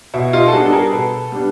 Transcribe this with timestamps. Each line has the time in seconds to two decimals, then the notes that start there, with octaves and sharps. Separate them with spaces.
0.14 B2 E4
0.33 D#4 F4
0.48 A4
0.53 G3 B3 D4 F#4 G#4
0.65 A4
0.72 G#4 A#4
0.92 B2 A4 B4
1.32 G3 B3 D4